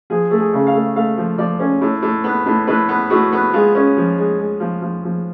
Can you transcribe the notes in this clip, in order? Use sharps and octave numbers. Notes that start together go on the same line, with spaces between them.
F3 G#4
A3
G#4
C#3
F5
A3
A3 F5
F3
F3 D5
C#4
A2
A2
B3
A2
A2 B4
B3
A2 F#4
B3
G#3 F4
C#4
F3
G#3
G#3
F3
F3
F3